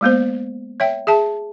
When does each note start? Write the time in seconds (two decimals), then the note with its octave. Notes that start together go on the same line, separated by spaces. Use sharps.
0.01 G#3 A#3 B3 C5
0.80 C#5 E5 G5
1.07 G#4 E5 A5